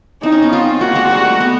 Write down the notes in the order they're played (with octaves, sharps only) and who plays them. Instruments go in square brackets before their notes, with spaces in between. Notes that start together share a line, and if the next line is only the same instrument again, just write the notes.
[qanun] C4 [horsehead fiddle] D#4
[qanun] C#4
B3
[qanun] C4 [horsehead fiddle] F4
[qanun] A#3 [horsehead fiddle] F#4
[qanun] G#3
G3
A3
B3